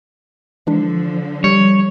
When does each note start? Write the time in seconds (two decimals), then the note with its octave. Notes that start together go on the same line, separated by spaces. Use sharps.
0.67 D3 E3 F3 G#3 D4
1.44 G3 C#5